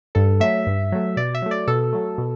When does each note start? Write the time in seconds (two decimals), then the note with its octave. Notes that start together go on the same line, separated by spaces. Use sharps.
0.15 G2 A4
0.40 F#3 A3 E5
0.67 G2
0.92 F#3 A3
1.17 B2 D5
1.35 E5
1.42 F#3 A3
1.51 D5
1.67 B2 A4
1.93 F#3 A3
2.18 B2